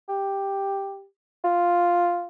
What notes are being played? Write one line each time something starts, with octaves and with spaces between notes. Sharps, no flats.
G4
F4